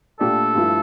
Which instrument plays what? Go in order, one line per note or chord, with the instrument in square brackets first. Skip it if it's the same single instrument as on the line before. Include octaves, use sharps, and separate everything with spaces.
[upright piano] A#2 A3 D4 G4 D5 [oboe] A4
[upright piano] G2 F3 A3 E4